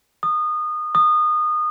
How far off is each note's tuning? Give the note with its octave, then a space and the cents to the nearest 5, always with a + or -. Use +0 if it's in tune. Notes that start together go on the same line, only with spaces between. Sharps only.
D#6 -25
D#6 -25